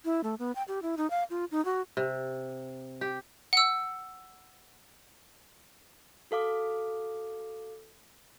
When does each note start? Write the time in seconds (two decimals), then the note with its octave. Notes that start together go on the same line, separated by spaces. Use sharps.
0.05 E4
0.24 A3
0.39 B3
0.55 G5
0.68 G4
0.82 E4
0.97 D#4
1.10 F5
1.30 F4
1.51 D#4
1.65 F#4
1.97 C3
3.01 G4
3.53 F#5 E6
6.31 F#4 A4 F5 D6